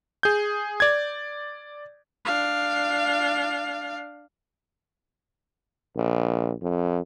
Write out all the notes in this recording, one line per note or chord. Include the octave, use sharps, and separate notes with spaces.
G#4 G6
D5 G#6
D4 F5
A#1
F2